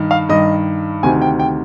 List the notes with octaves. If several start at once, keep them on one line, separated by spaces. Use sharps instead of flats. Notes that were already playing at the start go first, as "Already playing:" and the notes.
Already playing: G2 D#3
F5
G2 D#3 D#5
D2 C3 D#3 G#5
G5
G5